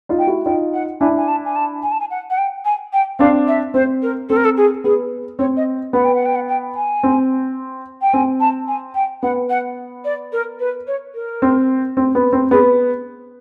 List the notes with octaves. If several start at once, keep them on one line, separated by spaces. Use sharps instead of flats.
D#4 F4
G5
E4 F#4
D#4 F4 G5
F#5
D4 E4 G#5
G#5
A5
G#5
A5
G#5
A5
G#5
F#5
F#5
G5
G#5
G5
C4 D4 F5
E5
C4 C5
A#4
C4 A4
A#4
A4
G#4
B3 G#4
C4 C#5
D#5
B3 F#5
G5
F#5
G5
F#5
G5
G#5
C4
G5
C4 G#5
A5
G#5
G5
B3 F#5
F#5
D5
A#4
B4
C#5
A#4
C4
C4
B3
C4
B3 G#4